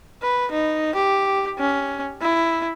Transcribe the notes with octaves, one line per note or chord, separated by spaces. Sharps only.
B4
D#4
G4
C#4
E4